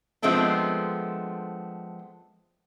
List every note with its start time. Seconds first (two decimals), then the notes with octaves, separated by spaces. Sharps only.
0.22 F3 G#3 A3 B3 C4 D4